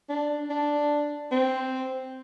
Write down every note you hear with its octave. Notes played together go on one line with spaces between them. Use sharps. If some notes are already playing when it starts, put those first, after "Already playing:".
D4
D4
C4